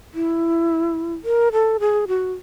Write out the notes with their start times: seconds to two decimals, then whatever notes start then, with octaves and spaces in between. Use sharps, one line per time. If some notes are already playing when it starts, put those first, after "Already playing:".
0.14 E4
1.24 A#4
1.52 A4
1.80 G#4
2.08 F#4